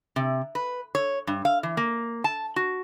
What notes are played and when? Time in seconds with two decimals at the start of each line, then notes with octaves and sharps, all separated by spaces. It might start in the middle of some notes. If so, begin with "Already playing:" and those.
0.16 C3
0.55 B4
0.95 C#5
1.27 G2
1.45 F5
1.63 E3
1.77 A#3
2.24 A5
2.56 F#4